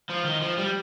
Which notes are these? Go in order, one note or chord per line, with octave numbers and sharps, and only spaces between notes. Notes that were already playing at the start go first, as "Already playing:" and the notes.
F3
D#3
F3
G3